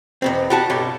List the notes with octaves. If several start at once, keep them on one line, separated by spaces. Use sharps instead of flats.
E2 B2 C4
G3 F#4 A5
B1 G2 G3 C#5